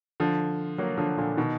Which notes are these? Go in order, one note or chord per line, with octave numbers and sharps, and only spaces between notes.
D3 F3
F#3 A#3
D3 F3
A#2 D3
B2 D#3